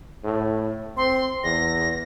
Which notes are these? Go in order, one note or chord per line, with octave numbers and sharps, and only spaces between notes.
A2
C4 C6
E2 A#6